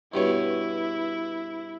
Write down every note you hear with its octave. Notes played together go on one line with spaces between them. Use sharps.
G2 B2 E4 C#5